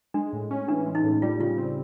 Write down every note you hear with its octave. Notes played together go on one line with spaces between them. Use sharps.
G#3 D4
A2
C#4
E3 D4
G#3
D#4
A2
G3 F4
C#3 F4
C4